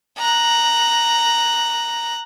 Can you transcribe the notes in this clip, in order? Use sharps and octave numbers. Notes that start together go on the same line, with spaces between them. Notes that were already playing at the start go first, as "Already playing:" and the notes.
A#5 F#6